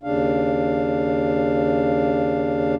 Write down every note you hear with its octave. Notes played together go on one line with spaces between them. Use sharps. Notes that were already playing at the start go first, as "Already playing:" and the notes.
D#2 C#3 D4 F5